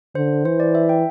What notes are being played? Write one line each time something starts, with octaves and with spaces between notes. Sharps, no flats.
D3 C5
E3 C5
D5
E5
G5